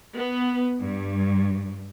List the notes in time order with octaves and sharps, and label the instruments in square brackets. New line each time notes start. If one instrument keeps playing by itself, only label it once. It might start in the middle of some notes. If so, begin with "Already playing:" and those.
[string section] B3
G2